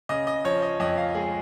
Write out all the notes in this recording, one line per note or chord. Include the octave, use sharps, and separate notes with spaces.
C#3 D#5
D#5
F3 C#5
D#5
F2 D#5
F5
G#3 G#4